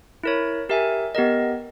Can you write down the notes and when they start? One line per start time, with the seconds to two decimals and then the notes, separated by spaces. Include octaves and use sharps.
0.23 E4 A#4 C#5
0.69 G4 A#4 E5 G#5
1.15 B3 G4 A#4 D#5